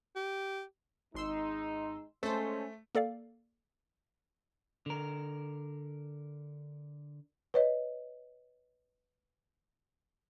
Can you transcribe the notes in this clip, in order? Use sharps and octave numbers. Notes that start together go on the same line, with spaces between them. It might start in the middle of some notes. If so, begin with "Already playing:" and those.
G4
G#1 G#3 D#4 C6 E6
G#3 A3 C#4 A4 C5
A#3 A4 D5 F5
D3 A#4
B4 C#5 D#5